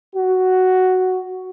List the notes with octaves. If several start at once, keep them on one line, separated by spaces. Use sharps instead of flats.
F#4